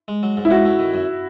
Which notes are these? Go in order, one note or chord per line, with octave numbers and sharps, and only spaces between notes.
G#3
F#3
G#2
E4
C#4 F#4
A3
D#3
F#2